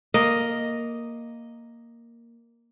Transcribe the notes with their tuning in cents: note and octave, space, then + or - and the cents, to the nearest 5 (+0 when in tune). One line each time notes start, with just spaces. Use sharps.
A#3 +0 D#5 +0